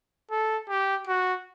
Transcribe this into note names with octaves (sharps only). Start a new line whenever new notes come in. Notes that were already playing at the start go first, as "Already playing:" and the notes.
A4
G4
F#4